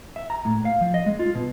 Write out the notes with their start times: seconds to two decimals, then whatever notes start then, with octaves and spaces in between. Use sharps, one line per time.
0.16 E5
0.30 A#5
0.45 A2
0.65 F5
0.81 F3
0.94 D#5
1.06 G#3
1.19 F4
1.35 B2